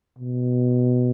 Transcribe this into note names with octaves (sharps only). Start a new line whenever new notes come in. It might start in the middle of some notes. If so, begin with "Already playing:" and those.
B2